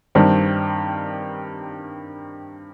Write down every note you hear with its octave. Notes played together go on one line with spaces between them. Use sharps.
G2 D#3 G3 C4